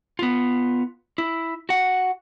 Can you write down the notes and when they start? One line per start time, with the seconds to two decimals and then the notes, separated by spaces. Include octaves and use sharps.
0.19 B3 F4
1.18 E4
1.69 F#4 F#5